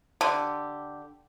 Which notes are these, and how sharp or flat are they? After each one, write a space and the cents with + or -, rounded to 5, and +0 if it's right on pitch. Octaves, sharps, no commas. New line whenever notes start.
D3 +5 G4 -5